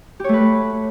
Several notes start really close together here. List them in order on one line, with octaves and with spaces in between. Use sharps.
G4 C#5 A3 B4